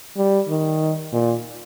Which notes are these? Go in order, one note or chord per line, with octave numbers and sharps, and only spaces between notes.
G3
D#3
A#2